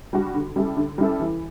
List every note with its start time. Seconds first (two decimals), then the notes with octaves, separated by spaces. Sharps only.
0.13 G3 D4 F#4
0.34 D3
0.56 G3 C#4 E4 A4
0.77 D3
0.98 G3 C#4 E4 A4
1.20 E3